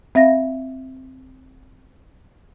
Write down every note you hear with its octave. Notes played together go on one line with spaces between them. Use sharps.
C4 E5 F5 A#6